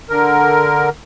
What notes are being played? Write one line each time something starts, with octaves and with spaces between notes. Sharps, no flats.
D3 A#4